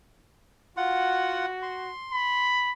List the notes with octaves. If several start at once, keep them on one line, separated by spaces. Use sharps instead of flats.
F4 F#4 F#5
C6
B5